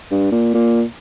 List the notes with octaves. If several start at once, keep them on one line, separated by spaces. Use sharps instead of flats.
G2
A#2
A#2